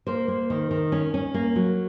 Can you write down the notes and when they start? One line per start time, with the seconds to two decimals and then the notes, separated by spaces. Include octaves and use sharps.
0.07 A#3 C5
0.28 A#3
0.50 D#3
0.71 D#3
0.92 C#4
1.14 C#4
1.34 A#3
1.56 F#3